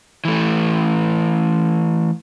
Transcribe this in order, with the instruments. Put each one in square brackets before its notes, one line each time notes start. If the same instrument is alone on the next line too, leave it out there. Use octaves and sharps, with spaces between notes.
[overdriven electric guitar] E3 A3